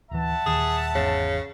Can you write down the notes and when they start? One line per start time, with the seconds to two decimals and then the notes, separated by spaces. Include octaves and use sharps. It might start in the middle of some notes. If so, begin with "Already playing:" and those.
0.11 D1 E3 E5 F#5 A5
0.46 D#1 D#2 G#4
0.95 G#1 E2 C#3